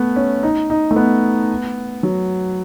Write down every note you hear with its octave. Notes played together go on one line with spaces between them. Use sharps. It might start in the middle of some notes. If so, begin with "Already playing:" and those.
Already playing: A3 B3
C#4
D#4
D#4
A3
B3
F#3